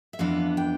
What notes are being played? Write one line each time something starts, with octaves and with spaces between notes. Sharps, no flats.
E5
F2 E3 B3 D4 F5
G5